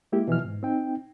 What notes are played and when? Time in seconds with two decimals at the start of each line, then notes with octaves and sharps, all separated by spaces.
0.12 G#3 A#3 E4 G4
0.27 B2 E3 F3 F6
0.44 G#2
0.63 C4 D#4 G5